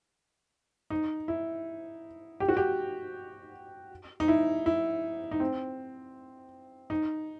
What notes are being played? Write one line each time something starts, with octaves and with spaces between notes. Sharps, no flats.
D#4
E4
G4
F#4
G4
D#4
E4
E4
D#4
C4
D#4